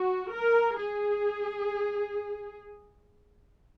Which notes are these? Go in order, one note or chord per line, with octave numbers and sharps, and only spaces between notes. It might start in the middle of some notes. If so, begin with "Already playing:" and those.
Already playing: F#4
A#4
G#4